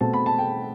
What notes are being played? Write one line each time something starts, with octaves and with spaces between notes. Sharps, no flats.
B2 A3 C4 A5
B5
A5
G5